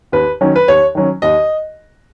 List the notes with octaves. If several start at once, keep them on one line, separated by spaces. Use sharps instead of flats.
D#2 B4
D#3 F#3 C#4
B4
D#2 C#5
D#3 F#3 C#4
D#2 D#5